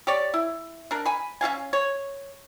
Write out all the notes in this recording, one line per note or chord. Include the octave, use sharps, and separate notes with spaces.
G4 C#5 D5
E4
D4 A#4
G#5 B5
C#4 F4 F5 G#5
C#5